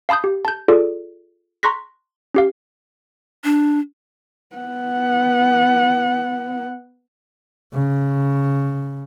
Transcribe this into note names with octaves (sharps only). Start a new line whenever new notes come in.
F5 A5 B5 D#6 G6
G4
A5 G6
F4 G#4 A4 D5
A#5 C6 C#6 F#6 A#6 B6
C#4 G4 F5
D4
B3 F#5
C#3